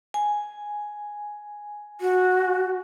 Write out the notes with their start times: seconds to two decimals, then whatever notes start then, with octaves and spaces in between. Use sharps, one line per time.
0.14 G#5
2.01 F#4